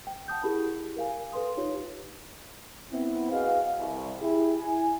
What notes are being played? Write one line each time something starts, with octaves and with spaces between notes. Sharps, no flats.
G5
F#5 A5 D#6 G6
E4 G4 G#4 A#4 B5
A#4 F5 G#5
A4 B4 F5 C6 D#6
D#4 F4 G4 B4 C#5
B3 C4 E4
E4 F#4 G#4 B4 D#5 F5
C2
E4 G4 G#4
E4 G#5